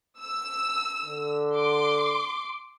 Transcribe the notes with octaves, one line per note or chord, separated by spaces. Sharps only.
E6
D3
C6 D6